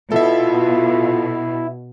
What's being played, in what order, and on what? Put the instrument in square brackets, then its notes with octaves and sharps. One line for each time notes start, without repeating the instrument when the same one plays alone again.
[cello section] B2 [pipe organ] E4 [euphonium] F4 [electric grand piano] A4 E5